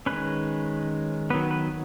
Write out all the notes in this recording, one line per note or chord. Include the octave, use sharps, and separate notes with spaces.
D#3 G#3 C#4 B4
D#3 F#3 B3 B4
B4